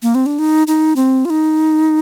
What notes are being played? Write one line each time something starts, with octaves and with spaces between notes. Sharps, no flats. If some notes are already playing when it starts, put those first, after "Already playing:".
A#3
C4
D4
D#4
D#4
C4
F4
D#4